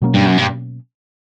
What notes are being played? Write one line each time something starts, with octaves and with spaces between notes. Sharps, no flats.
B2 F#3 A#3 C#4
G2
F#2
G2